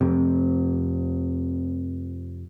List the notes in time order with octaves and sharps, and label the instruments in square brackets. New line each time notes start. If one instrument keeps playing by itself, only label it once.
[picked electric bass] F2 C3